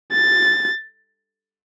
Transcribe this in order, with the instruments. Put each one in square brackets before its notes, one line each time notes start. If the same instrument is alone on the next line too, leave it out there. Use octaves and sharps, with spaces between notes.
[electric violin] A6